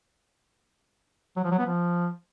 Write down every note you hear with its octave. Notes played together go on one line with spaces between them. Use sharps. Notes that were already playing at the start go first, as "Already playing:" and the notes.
F#3
F3
F#3
B3
F3